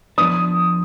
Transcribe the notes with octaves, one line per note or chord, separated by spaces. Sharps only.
F3 B3 D4 D#6